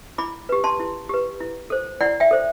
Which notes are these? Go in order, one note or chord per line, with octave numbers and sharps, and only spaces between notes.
E4 B5 D6
G4 B4
A5 C6
E4
G4 B4
E4
A4 C5
E4 D5 F#5
E5 G5
A4 C5